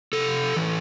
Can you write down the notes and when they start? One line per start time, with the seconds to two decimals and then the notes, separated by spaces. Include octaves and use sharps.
0.13 C3 A4
0.56 E3